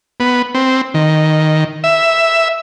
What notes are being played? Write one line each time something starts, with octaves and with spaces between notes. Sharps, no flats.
B3
C4
D#3
E5